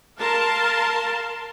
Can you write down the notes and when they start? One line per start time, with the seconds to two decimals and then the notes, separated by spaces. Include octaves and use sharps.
0.18 A#4 F5 A5 C6